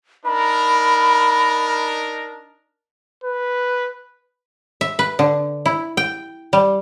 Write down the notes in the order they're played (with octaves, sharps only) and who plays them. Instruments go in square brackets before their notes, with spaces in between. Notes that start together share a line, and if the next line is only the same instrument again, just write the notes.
[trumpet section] D4 D#4 A#4 [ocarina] B5
[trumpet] B4
[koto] E5
B4
D3
E4
G5
G3